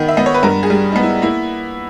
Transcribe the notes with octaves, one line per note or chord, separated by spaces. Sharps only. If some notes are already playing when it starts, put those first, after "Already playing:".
Already playing: D#3 B3
E5
B3 D#5
C#5
B4
G2 A#4
G#4
G3
B3 D#4
E4
A#3 E4